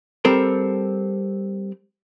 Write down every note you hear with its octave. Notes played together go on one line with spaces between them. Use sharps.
G3 C4 A4 A#4